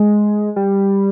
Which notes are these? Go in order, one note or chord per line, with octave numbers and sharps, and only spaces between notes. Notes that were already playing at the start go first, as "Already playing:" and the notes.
Already playing: G#3
G3